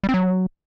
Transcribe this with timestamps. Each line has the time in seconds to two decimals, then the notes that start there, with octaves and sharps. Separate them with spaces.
0.03 G3
0.09 C4
0.14 F#3